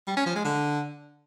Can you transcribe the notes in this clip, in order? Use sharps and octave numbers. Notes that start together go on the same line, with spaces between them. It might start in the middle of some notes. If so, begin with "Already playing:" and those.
G3
C#4
F3
G#3
D3